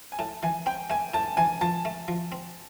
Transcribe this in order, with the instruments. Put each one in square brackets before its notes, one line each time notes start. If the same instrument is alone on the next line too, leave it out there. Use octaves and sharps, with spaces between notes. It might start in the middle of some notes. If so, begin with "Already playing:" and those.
[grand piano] G#5
[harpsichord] A2 [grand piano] A5
[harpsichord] E3 [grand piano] G#5
[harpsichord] C4 [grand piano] G5
[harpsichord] A3 [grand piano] G#5
[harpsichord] A2 [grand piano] A5
[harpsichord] E3 [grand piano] G#5
[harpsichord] F3 [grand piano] A5
[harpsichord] A3
F3
C4